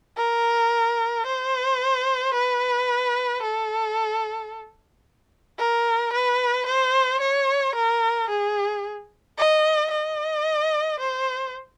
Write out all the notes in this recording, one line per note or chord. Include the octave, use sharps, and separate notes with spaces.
A#4
C5
B4
A4
A#4
B4
C5
C#5
A#4
G#4
D#5
D#5
C5